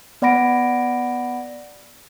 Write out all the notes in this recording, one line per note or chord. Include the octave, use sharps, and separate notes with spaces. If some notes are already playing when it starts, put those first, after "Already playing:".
B3 D5 F#5 B5 A#6 D7